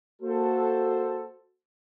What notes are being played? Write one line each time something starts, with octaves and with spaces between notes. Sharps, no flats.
A#3 F#4 A4 C5